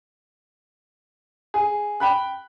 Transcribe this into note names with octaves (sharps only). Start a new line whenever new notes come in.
G#4
G5 B5 F#6